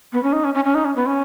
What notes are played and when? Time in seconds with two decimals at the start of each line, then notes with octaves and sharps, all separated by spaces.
0.13 B3
0.23 C#4
0.33 D#4
0.44 C#4
0.54 C#4
0.64 C#4
0.75 D#4
0.85 C#4
0.96 B3
1.06 C#4